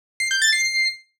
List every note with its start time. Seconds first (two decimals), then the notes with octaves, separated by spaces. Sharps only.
0.20 C7
0.31 G6
0.42 A6
0.52 C7